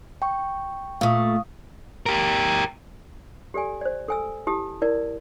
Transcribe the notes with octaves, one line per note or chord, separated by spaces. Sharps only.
G5 C#6
A#2 A3 F5 C#6 D#6
G4 A#4
G4 A4 D5 G#5
C5 D5
A4 G#5 E6
E4 G4 A5 D#6
E4 A#4 D5